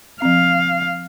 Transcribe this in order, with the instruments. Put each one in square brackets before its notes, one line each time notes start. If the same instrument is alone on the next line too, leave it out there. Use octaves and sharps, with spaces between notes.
[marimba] F3 C4 [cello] F5